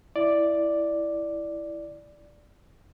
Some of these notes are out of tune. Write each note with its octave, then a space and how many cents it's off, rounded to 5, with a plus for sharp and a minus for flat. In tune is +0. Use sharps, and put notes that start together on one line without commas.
E4 +5 D5 +0